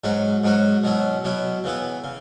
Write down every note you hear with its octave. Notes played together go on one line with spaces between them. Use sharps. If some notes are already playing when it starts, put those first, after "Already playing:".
G#2 F#3 C#4 F#4
G#2 F#3 C#4 F#4
B2 F#3 C#4 E4
B2 F#3 C#4 E4
C#3 E3 B3 E4
C#3